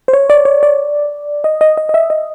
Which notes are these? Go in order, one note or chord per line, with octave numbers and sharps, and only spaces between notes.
C5
C#5
D5
C#5
D5
D#5
D#5
D#5
D#5
E5
D#5